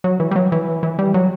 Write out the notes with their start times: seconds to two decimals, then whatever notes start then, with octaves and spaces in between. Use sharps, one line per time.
0.04 F#3
0.20 E3
0.31 G3
0.36 F#3
0.52 E3
0.83 E3
0.99 G3
1.14 F#3